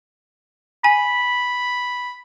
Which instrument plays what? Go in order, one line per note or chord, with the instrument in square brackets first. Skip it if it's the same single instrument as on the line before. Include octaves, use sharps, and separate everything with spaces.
[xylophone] G#5 [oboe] B5